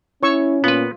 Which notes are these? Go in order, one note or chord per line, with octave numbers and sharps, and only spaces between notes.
C#4 E4 C#5 C#6 E6
A#2 B3 F4 B4